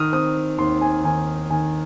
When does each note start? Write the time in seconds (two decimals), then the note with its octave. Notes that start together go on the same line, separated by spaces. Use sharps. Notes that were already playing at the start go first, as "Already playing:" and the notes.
Already playing: D#3 D#6 F6
0.12 C4 D#6
0.58 D#2 C6
0.81 G#5
1.04 D#3 G#5
1.50 D#3 G#5